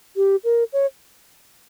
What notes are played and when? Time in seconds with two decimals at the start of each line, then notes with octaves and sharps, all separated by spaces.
0.16 G4
0.44 A#4
0.73 C#5